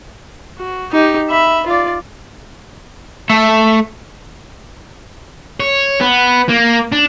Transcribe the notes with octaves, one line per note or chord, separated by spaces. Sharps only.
F#4
D#4 G4
E5 B5
F4 D5
A3 A4
C#5
B3
A#3
D4